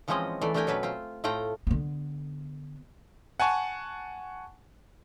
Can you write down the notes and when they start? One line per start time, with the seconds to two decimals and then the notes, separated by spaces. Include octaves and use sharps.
0.08 E3 F3 G#3 C4 C#4 D#5
0.41 E3 A3 D5
0.54 A3 D4 G4 A#4 G5 G#5
0.67 B2 F#3 C#4 B4
0.83 C4 F4
1.24 A2 A3 F4 G5 A#5
1.67 D3 B3
3.40 F#5 G#5 A5 C#6